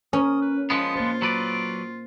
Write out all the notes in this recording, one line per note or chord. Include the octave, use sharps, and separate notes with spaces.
C#4 A#4 D#6
B4
F3 G#3 B3 D#6
A#3 F4 C5
F#3 B4 D5